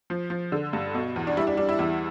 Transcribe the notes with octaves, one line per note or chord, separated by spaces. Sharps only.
F3
F3
D3
G2
B2
E2
D4
G3 E4
D4
G3 D4
E4
E2 E4